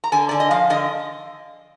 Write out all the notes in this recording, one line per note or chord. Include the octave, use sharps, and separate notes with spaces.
A#5
D3 G#5
D3 D5
D#5
F3 F5
D3 D#5